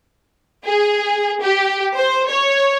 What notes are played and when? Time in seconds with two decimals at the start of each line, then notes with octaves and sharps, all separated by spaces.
0.65 G#4
1.42 G4
1.96 C5
2.29 C#5